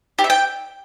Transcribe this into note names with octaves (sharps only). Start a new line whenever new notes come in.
G4
E5
G5